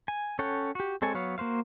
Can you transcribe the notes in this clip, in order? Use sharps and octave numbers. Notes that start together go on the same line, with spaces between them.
G#5
C#4 A4 C#5 F#5 G5
F#4 G4
G#3 C4 A4 C#5 G#5
F#3 B3 C#5 F5
A#3 F#4 C5 F5